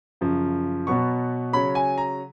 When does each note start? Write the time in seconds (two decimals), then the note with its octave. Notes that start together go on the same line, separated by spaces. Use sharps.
0.21 F#2 C#3 F3
0.87 B2 F#3 B3 C#6
1.53 C#3 F#3 C#4 B5
1.75 G#5
1.98 A#5